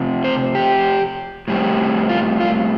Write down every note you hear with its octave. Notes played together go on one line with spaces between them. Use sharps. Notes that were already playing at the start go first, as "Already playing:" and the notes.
Already playing: C3 F3 A3 C4
C5
G4
A2 G3 C4
F4
F4